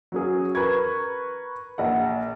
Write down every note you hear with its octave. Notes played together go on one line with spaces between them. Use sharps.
F#3 C#4 G#4
A#4 B4 A#5 B5 C#6 G#6
A#1 F#5